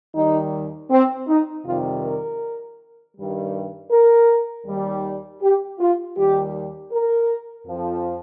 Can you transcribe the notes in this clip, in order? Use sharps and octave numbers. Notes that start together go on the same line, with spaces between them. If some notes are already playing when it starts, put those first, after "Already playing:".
D#2 D#3 G3 D#4
C4
D#4
F2 C3 D#3 G3 F4
A#4
G2 D#3 G3
A#4
D#2 D#3 G3
G4
F4
D#2 D#3 G3 G4
A#4
F2 F3